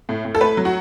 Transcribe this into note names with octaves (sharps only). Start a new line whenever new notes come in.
A2
A2
A4
A3 B4
F#3
F#4